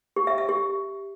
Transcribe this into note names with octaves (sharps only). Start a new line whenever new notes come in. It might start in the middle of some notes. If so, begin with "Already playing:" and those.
G4
E5
E5
G4